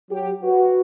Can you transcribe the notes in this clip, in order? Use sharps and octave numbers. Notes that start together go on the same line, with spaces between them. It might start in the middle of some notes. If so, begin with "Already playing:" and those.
F#3 G4
F#4 B4